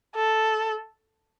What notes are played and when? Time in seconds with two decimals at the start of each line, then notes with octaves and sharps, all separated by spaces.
0.15 A4